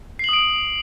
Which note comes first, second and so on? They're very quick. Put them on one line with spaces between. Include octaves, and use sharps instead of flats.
C7 F#7 D#6 D7